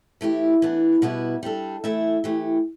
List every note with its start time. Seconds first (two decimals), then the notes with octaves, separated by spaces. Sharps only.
0.21 E3 A3 E4 G4
0.62 E3 B3 D4
1.02 B2 G3 B3 E4 B4
1.43 G3 D4 A4
1.84 E3 A3 E4 A4 E5
2.24 E3 A3 G4